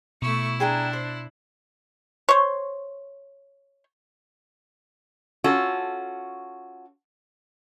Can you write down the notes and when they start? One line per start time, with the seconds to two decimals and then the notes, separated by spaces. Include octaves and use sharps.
0.22 B2 A3 E4 C#6
0.60 D4 G#4 G5 A#5
0.93 C5
2.29 C5 C#5
5.44 C#4 F4 F#4 A4